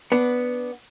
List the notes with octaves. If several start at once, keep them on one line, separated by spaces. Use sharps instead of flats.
B3 D4